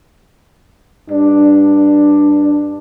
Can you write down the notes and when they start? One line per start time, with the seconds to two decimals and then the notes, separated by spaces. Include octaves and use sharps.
1.09 G2 D4